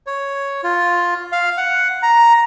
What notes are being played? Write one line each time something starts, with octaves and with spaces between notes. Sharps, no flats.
C#5
F4
F5
F#5
A#5